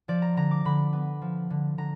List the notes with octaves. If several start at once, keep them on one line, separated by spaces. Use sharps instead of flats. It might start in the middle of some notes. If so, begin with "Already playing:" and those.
F3 D5
A#5
D3 A#5
D6
D3 B5
B3
F3
D3
D3 A#5